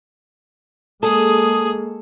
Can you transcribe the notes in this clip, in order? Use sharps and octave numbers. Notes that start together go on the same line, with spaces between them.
G#3 A#3 G#4 A4 D#6